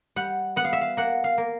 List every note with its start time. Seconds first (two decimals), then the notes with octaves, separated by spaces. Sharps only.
0.16 G3 F#5
0.56 B3 F#5
0.65 F5
0.73 E5
0.81 F5
0.97 A#3 F#5
1.24 F5
1.38 A#3